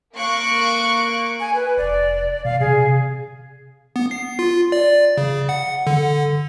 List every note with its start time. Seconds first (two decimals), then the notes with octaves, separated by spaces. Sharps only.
0.16 A#3 F5 C#6 F#6 D7
1.40 G#5
1.54 B4
1.77 F1 D5
2.45 B2 F5
2.60 C3 G#4
3.96 B3
4.11 C7
4.39 F4
4.72 D5
5.17 C#3
5.49 F#5
5.87 D3